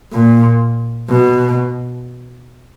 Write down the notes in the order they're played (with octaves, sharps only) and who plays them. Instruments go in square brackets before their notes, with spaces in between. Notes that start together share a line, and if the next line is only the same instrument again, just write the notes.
[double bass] A#2
B2